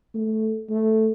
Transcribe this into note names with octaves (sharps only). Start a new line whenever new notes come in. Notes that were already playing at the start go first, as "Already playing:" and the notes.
A3
A3